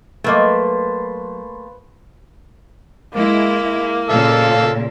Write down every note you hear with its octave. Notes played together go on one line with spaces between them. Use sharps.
F#3 A3 A#3 B4 C5 D#5
G#3 A#3 E4
A#2 C#3 A4 F5 E6